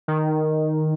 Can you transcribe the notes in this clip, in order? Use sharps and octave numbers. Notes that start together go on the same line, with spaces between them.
D#3